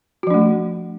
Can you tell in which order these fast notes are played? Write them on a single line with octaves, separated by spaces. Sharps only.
F#4 F3 D4 A3